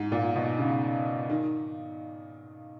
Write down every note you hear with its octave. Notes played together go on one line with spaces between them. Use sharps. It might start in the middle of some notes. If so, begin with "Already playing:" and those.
Already playing: G#2
A#2
B2
C#3
D#3